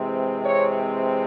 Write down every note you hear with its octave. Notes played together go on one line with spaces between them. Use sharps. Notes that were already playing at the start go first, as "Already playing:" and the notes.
Already playing: C3 E3 G#3 C4
C#5